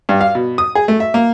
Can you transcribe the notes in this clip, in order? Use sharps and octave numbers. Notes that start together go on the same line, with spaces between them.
G2
F5
B2
D#6
G#4
A3
E5
A#3